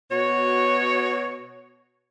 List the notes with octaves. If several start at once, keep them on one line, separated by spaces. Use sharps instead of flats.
B2 F#4 C#5